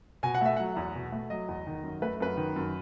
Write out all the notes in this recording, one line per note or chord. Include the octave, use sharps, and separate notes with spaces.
B2 G#5
F#5
A3 E5
F#3 F#5
E2
B2
A3
F#3 D#5
E2
D#3
F#2
A3 B4
F#2 B4
D#3
F#2